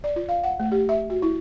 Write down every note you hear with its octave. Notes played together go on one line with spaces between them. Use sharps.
D5
F4
F5
F#5
A3
G4
E5
F#4
E4